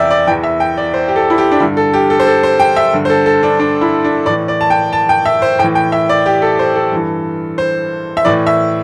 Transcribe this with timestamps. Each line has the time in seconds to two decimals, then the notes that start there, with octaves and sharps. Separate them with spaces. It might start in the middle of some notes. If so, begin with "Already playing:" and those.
Already playing: E2 C3 E3 D5 E5 G5
0.11 D5
0.27 E3 G5
0.31 E2
0.43 E5
0.60 G5
0.77 D5
0.94 C5
1.08 G4
1.16 A4
1.30 E4
1.38 G4
1.51 D4
1.60 G2 D3 E4
1.77 A4
1.94 G4
2.10 A4
2.20 C5
2.27 A4
2.43 C5
2.60 G5
2.76 E5
2.93 G2 D3
3.05 C5
3.10 A4
3.26 A4
3.43 D4
3.59 D4
3.81 E4
4.04 D4
4.26 A2 E3 D5
4.48 D5
4.61 A5
4.70 G5
4.93 A5
5.09 G5
5.25 E5
5.42 C5
5.59 A2 G5
5.63 E3
5.75 G5
5.92 E5
6.09 D5
6.26 G4
6.42 A4
6.59 C5
6.76 A4
6.92 G2 E3
7.58 C5
8.17 E5
8.25 A2 E3 D5
8.46 E5